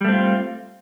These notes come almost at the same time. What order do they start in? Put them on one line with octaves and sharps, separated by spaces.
G3 A3 C4 F4